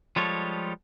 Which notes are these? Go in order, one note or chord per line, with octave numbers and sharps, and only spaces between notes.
F3 G3 G#3 F4 A4 C#5